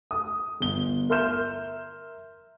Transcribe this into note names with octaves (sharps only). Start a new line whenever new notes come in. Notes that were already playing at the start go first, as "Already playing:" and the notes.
D#6
G1 G7
A#4 E5 C6 F6 G6 E7